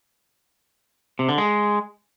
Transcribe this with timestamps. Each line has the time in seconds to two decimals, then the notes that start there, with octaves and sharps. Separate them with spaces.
1.19 C3
1.29 D3
1.38 G#3